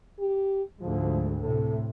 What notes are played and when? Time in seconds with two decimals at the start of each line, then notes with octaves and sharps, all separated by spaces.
0.20 G4
0.81 D2 G#2 F3
1.41 A2 C3 A4